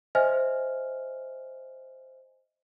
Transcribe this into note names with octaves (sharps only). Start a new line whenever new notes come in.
C5 D#5 E5 G#5 F6